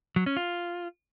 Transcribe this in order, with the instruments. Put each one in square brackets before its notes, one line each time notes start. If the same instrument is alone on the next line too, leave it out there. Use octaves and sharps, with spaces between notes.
[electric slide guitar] F#3
C#4
F4